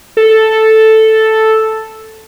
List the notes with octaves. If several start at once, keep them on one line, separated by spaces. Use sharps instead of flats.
A4